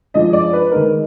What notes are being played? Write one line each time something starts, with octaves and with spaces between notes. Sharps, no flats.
F3 G#3 D4 D#5
D5
B4
D#3 G#3 D#4 A#4